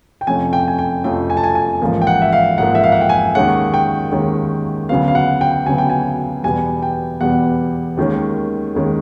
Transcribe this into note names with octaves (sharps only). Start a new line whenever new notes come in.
G5
F2 C3 F3 A3 C#4 G#5
G5
G#5
G5
F2 C3 F3 A3 C#4 G5
G#5
A5
G#5
G#5
A1 G#2 F3 A#3
G5
F#5
E5
F5
A1 G#2 F3 A#3 F#5
E5
F5
F#5
G5
G#5
D#2 D#3 G#3 C#4 F#5
G5
D#2 D#3 G#3 C#4
D2 C#3 F#3 B3 F5
F5
F#5
G5
D2 C#3 F#3 B3 G#5
G5
G#5
E2 B2 G3 B3 G#5
G5
E2 B2 G3 B3 F#5
D#2 D#3 G#3 C#4
D#2 D#3 G#3 C#4